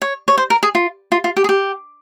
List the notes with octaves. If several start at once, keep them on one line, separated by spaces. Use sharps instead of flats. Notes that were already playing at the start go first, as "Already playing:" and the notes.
C#5
C#5
C5
A#4
G#4
F4
F4
F4
G4
G#4
G4